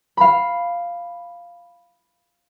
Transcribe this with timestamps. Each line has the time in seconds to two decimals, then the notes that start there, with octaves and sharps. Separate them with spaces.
0.17 F5 B5